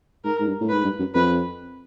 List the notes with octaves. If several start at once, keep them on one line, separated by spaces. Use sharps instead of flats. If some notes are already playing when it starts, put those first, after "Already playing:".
G#2 A#4
G#2
G2
A2
G#2 B4
G2
F#2
F2 B4